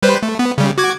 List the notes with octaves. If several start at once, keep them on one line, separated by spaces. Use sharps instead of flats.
G3 B4 C5
A3
B3
C#3 G3
F#4 D6 G#6